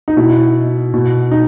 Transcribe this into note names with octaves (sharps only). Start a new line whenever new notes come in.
D#4
B2 E4
B2
D#4